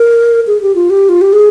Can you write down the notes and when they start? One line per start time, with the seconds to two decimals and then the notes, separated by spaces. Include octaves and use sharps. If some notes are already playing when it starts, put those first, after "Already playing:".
Already playing: A#4
0.47 G#4
0.62 G4
0.75 F4
0.90 G4
1.09 F4
1.21 G4
1.33 G#4